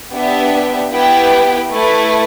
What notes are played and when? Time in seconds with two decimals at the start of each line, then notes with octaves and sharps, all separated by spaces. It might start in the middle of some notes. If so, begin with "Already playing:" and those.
0.13 B3 D4 G4 E5
0.92 B3 E4 G4 B4 G5
1.72 A3 E4 B4